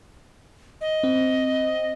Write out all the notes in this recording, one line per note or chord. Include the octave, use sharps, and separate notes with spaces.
D#5
C4